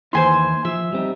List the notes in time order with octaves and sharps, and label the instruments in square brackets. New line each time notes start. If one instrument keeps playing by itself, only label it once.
[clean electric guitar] D#2 E3 E4 [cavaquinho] C5 G#5 C6
[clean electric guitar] F3 [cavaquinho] E5
[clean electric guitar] G3 C4 D#4